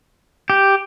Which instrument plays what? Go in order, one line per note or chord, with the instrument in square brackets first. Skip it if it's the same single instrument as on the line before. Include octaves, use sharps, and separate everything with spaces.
[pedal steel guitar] G4